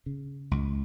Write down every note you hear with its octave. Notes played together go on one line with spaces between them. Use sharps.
C#3
C#2